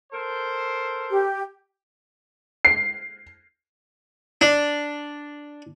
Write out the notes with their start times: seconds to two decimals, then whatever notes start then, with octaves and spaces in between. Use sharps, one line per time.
0.12 A4 A#4 C5
1.11 G4
2.65 C7
4.41 D4